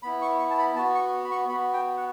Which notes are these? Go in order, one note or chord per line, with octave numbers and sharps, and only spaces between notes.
B3 E4 B5
C#6
C#6
A5
B5
B3 F#4 A5
C#6
B5
C#6
B3 F#4 B5
G5
F#5